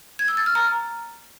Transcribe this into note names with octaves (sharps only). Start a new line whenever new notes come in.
G#6
E6
A6
F6
A#5